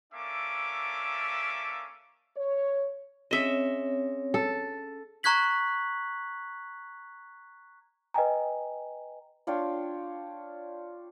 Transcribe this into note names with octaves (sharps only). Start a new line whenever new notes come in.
A#3 C#4 D4 A4 E5 D6
C#5
C4 C#4 G#4 C#5 D#5 E5 A#6
A4
A#5 C#6 F#6 G#6 B6 F#7
B4 D#5 G5 G#5 A#5
D4 F4 C#5 G5